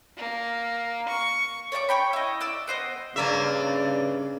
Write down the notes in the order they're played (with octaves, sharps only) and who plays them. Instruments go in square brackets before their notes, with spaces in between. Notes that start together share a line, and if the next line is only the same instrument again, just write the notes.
[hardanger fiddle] A#3
C#6
[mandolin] C#5 D5 E5 D6
C#5 G5 B5
E4 D#5
D5 D6 E6
B3 C5 D#5
[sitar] G2 A#3 E5 [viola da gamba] C#3 [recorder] D5